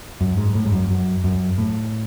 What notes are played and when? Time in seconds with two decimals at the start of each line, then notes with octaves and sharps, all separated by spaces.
0.21 F#2
0.38 G#2
0.55 A2
0.66 G#2
0.72 F#2
0.90 F#2
1.24 F#2
1.58 A2